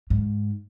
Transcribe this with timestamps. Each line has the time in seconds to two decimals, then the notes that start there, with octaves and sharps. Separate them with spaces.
0.10 G#2